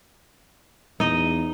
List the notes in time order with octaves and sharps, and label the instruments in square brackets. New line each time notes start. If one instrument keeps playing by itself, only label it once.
[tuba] E2 [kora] D#4 D#5